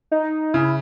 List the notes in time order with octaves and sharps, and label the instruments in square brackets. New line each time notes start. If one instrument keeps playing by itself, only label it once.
[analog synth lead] D#4
[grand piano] C#3 [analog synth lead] E4